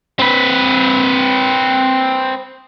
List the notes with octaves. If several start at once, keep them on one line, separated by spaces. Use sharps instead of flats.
C4 B4